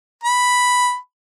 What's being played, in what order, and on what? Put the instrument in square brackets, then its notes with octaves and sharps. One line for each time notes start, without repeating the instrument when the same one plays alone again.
[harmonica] B5